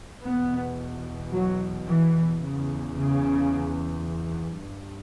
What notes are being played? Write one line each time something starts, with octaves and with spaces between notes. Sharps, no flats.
E2 B2 B3
F#3
E3
E2 C#3
C#3
G2